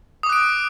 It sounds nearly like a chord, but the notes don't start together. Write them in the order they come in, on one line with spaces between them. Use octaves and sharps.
D#6 D6 F#6 D7